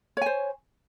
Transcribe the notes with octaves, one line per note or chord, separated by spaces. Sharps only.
C5 C#5 G#5